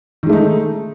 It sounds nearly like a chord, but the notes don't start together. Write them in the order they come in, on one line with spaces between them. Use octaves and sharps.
D#3 G#3 A3 D#4